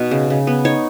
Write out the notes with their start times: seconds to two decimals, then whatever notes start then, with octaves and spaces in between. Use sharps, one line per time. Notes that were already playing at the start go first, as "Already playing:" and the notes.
Already playing: B2 D#4
0.11 C#3
0.30 C#3
0.47 B3
0.65 D#4 C#5